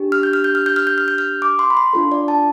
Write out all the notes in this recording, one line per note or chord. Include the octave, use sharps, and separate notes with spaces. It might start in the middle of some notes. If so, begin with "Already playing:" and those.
Already playing: D4 G4
F6
G6
F6
G6
F6
G6
F6
G6
F6
G6
F6
D6
C6
B5
C6
D4 F4 A4
D5
A5